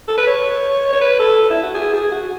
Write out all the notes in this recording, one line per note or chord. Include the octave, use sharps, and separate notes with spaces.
A4
B4
C#5
C#5
B4
A4
E4
F#4
G#4
G#4
F#4